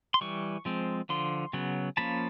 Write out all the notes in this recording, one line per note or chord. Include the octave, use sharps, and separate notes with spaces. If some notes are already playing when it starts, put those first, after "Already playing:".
C6
E3 G3 C#6
F3 G#3 C4
D3 F3 C6
C#3 F#3 B3
F3 A#3 C#4 A5 B5